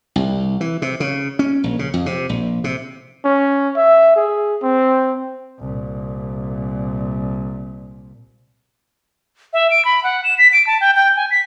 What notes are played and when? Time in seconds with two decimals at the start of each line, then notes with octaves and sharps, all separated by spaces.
0.16 C2
0.61 E3
0.82 C3
1.00 C#3
1.39 C#4
1.64 A#1
1.79 C#3
1.94 F2
2.06 C3
2.29 A#1
2.64 C3
3.25 C#4
3.76 E5
4.16 G#4
4.62 C4
5.59 C2 A#2
9.53 E5
9.71 D7
9.85 B5
10.04 F#5
10.24 E7
10.38 B6
10.53 D7
10.67 A5
10.81 G5
10.96 G5
11.16 G#5
11.31 B6